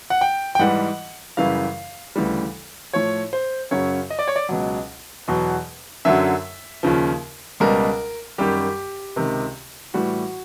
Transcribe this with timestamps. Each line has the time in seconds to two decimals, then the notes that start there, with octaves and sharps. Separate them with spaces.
0.10 F#5
0.21 G5
0.55 G5
0.59 G#2 E3 G3 F#5
1.37 F#2 C#3 E3 G3 F5
2.16 D2 C#3 E3 G3
2.93 A2 F3 C#5
3.33 C5
3.71 F#2 C#3 F#3 C#5
4.10 D#5
4.19 D5
4.28 C#5
4.36 D5
4.49 C#2 B2 F#3
5.28 E2 B2 F#3
6.05 F#2 D3 F#3 E5
6.83 D#2 C#3 F3
7.60 C#2 B2 G3 A#4
8.38 F#2 D#3 G3 G4
9.16 C#2 C3 D#3
9.94 A2 E3 G3 F#4